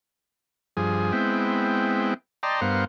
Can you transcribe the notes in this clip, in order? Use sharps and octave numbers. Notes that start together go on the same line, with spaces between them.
G2 F3 G#4
G#3 B3 C4 E4 G5
D5 D#5 G5 A5 A#5 C6
G2 B3 A#4 C5 F5 F#5